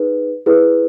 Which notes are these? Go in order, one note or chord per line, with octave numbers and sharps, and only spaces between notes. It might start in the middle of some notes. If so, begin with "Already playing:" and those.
Already playing: D#4 G#4 B4
E4 G#4 B4